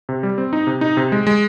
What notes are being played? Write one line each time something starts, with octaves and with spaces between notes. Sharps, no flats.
C3
G3
C4
D#4
C3
D#4
C3
G#3
G#3